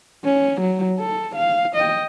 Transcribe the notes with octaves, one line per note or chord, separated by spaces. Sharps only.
C#4
F#3
A4
F5
D#5 G5